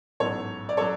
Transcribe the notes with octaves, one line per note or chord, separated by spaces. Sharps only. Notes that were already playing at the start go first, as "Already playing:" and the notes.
A1 G#2 F#3 B3 A4 C#5
D5
F#3 A4 C#5